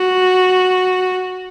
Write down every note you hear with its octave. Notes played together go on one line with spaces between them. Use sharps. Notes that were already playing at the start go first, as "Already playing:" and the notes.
Already playing: F#4